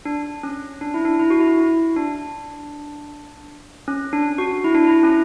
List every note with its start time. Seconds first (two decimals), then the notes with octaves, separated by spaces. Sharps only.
0.05 D4
0.43 C#4
0.81 D4
0.94 E4
1.05 D4
1.20 E4
1.30 F#4
1.40 E4
1.58 E4
1.96 D4
3.88 C#4
4.13 D4
4.38 F#4
4.64 E4
4.75 D4
4.87 E4
5.03 C#4